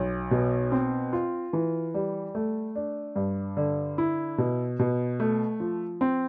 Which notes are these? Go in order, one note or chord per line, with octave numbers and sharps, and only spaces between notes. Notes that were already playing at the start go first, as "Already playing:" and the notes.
Already playing: B1
B2
C4
F4
E3
G3
A3
D4
G2
D3
E4
B2
B2
A3
F3
C4